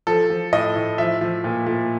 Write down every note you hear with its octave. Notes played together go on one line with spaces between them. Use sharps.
F3 A4
F3
A2 D#5
A2
F3 E5
F3
A#2
A#2